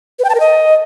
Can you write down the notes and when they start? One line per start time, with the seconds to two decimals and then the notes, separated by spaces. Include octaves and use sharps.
0.19 B4
0.24 G5
0.30 A5
0.35 A#4
0.40 D#5